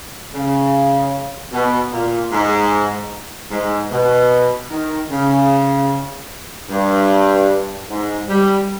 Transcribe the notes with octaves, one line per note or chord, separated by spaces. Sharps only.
C#3
B2
A#2
G#2
G#2
B2
D#3
C#3
G2
G#2
G3